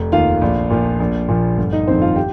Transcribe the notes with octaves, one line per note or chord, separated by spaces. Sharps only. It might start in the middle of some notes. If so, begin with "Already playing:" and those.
Already playing: F1
D#2 D#3 F4 F5
A#1
A#2 F3
A#1
A#2 F3
G1
D#4 D#5
F2 D#3 C4 C5
F4 F5
G4 G5